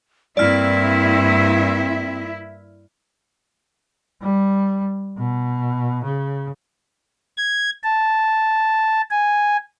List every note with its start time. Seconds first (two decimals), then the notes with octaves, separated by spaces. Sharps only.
0.37 G2 A#3 C4 E4 D5 E5 F6
4.22 G3
5.18 B2
6.04 C#3
7.37 G#6
7.83 A5
9.11 G#5